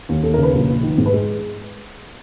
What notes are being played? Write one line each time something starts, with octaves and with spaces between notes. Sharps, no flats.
D#2
D#2 A4
A#4
C#3
B4
A#1
A#1
D#3
G#2
B4
G#3